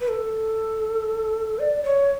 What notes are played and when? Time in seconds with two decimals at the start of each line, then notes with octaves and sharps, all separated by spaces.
0.01 B4
0.08 A4
1.59 D5
1.83 C#5